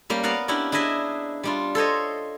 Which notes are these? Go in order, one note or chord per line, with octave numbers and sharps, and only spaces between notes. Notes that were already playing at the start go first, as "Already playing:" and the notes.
G3 A#3 C#4 G4
B3 A#4 D5 F5 F#5
C#4 D4 E4 G4 F#5
D4 E4 G#4 D#5 E5
G3 D4 F4
A4 C5 C#5 D#5